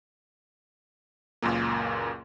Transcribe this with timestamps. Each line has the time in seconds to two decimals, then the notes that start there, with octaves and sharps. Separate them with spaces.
1.42 C#2 F#2 A#2 A#3